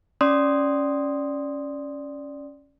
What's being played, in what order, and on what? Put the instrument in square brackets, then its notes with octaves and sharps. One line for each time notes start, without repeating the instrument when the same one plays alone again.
[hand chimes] C#4 D5 C6 D#6